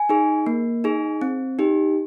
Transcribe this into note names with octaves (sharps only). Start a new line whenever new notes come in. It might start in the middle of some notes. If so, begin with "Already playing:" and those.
Already playing: G#5
D#4 G#4
A#3
D#4 G#4
C4
D#4 G4